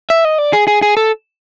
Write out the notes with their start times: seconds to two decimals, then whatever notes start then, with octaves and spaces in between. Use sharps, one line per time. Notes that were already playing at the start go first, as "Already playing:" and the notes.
0.10 E5
0.25 D#5
0.38 D5
0.53 G#4
0.67 G#4
0.82 G#4
0.97 A4